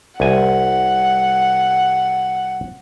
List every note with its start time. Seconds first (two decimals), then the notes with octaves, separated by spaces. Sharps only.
0.20 C2 F#5 G#5